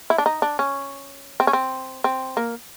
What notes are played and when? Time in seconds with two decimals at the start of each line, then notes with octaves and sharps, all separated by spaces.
0.10 E4
0.18 D4
0.26 D#4
0.42 D4
0.59 C#4
1.40 C4
1.47 C#4
1.53 C4
2.04 C4
2.37 A#3